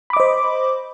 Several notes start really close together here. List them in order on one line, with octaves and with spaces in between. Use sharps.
B5 D6 D#5 C5